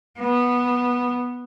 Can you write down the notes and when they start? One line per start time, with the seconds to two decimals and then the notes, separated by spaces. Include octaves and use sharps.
0.19 B3